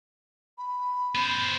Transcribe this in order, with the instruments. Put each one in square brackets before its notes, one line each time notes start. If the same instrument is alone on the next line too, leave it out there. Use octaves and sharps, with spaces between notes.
[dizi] B5
[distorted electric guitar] B3 C5